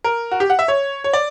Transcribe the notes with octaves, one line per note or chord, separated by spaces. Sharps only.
A#4
F#4
G4
F#5
E5
C#5
C#5
D5